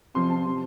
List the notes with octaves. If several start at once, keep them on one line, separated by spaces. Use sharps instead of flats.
F2 C3 F3 C6
A5
C3 F3